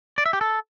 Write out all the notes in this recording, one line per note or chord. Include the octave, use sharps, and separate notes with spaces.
D5
E5
G4
A4